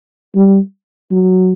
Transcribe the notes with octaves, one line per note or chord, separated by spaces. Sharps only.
G3
F#3